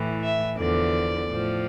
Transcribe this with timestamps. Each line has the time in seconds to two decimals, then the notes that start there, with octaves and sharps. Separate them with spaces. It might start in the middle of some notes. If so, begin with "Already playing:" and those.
Already playing: A2 E3
0.22 E5
0.58 E2 D3 F3 D5
1.30 A2 F3